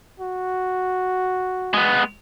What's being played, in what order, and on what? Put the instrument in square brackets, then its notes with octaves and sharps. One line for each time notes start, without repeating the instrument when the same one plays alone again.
[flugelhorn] F#4
[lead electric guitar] G#3 B3